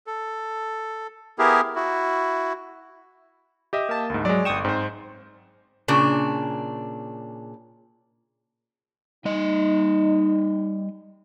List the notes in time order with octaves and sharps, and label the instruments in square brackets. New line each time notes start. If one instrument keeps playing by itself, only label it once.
[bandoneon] A4
B3 E4 G4 G#4 A#4
E4 F#4
[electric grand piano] G4 D#5 E5
[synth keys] A#3 A5
[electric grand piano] D2 G#2
[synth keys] F#3 [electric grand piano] G#3 D5
[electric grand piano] G1 E7 [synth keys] G5 C#6 D#6
[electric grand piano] G#2 C5 [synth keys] C4
[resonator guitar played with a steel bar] A#2 C#3 D4
[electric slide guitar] G3 D#5 [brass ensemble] D#4